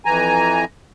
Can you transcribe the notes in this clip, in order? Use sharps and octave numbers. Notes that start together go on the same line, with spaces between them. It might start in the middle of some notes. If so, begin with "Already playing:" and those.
F2 E3 G#5 A#5